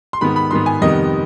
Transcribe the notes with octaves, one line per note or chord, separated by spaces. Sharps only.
C6
G#2 D#3 B3 B5
B5
G#2 D#3 B3 C6
G#5
F2 C3 D#3 G3 B3 D#5